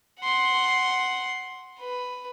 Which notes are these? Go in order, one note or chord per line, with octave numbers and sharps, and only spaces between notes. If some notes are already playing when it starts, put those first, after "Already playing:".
F#5 C6
B4